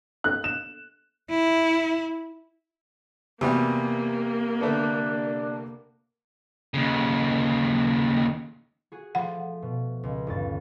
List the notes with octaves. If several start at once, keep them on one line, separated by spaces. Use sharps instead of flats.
F#6
E7
E4
E2 C3 G3 A#3 F#4
D3 A3 B3 D4
D#2 C#3
F#4 G#4
F3 A3 F#5
B2
C#2
G1 D#2 A6